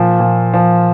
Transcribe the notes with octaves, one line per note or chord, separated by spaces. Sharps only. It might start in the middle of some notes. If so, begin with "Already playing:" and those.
Already playing: A#2 F3
A#2
F3